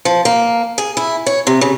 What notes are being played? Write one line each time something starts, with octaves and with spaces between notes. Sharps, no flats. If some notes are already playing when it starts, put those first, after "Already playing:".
F3
A#3
G#4
E4
C#5
C3
C#3